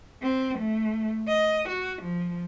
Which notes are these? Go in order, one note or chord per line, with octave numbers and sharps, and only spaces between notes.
C4
A3
D#5
F#4
F3